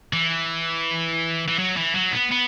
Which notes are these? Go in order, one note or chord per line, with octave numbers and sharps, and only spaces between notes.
E3
E3
F#3
E3
F#3
B3
B3